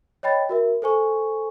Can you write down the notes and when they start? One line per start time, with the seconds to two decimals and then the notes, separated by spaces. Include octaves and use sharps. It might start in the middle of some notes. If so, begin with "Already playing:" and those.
0.23 C#5 D#5 G5 B5 A6
0.49 F#4 A#4 E5
0.82 A4 C5 G#5 C#6